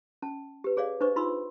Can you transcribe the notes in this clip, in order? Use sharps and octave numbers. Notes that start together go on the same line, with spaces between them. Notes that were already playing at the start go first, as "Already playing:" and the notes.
C#4 A5
G4 B4
G#4 C#5 D5 F5
D4 B4 C5 D#5 C#6
D#4 F4 B5 C6 E6